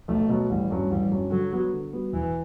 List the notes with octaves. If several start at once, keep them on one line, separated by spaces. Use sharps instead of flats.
B1 A3
B2 F#3
A1 G3
G2 F#3 C#4
A1 G3
G2 F#3 C#4
D3 F#3
G3 B3 F#4
D3
G3 B3 F#4
E1 E3